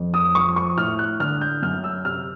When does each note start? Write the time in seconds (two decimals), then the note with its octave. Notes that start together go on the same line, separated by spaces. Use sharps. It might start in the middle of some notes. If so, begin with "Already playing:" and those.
Already playing: F2
0.14 D#6
0.35 F3 C#6
0.56 C#6
0.77 A2 F6
0.99 F#6
1.20 D3 F6
1.41 G6
1.62 F#2 F6
1.84 E6
2.05 C3 F6